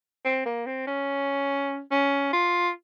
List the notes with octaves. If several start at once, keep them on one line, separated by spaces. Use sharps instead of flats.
C4
A#3
C4
C#4
C#4
F4